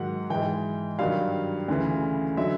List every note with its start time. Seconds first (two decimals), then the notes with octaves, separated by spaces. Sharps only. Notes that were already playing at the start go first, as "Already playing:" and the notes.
Already playing: G#2 D#3 F#3 F#5
0.30 G#2 E3 G5
0.99 G2 D#3 F#3 F5
1.68 D2 C#3 E3
2.37 D3 F#3 E5